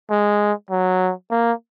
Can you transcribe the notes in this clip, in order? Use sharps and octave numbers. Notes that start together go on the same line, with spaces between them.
G#3
F#3
A#3